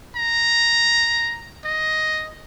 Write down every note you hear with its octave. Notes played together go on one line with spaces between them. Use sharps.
A#5
D#5